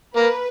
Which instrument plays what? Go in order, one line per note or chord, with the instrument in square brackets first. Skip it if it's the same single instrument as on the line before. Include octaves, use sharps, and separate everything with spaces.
[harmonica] A#3 [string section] B4